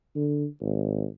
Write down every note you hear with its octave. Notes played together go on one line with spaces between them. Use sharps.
D3
G#1